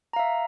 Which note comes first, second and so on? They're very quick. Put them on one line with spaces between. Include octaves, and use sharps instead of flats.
A#5 F5 E5